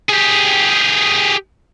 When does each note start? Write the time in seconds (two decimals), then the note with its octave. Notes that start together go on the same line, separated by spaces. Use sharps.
0.09 G4 G#4